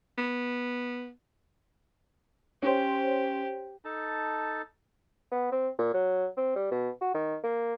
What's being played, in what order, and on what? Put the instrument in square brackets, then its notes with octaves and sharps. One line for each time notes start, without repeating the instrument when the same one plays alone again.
[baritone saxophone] B3
[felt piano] C#4 [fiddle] G4 [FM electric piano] C5 C#5
[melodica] D#4 A4 A5
[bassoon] B3
C4
A#2
F#3
C4
G3
B2
F#4
D#3
A#3